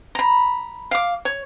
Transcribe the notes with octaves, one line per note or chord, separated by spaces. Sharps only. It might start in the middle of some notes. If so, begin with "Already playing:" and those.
A#5 B5
F5 D6
C#5